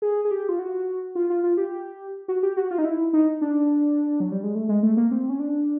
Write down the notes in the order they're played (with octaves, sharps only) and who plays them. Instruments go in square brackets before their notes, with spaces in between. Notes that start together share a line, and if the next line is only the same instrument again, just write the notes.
[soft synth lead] G#4
G#4
G4
F4
F#4
F4
F4
F4
G4
F#4
G4
F#4
F4
D#4
E4
D#4
D4
F#3
G3
G#3
A3
G#3
A3
A#3
C4
C#4
D4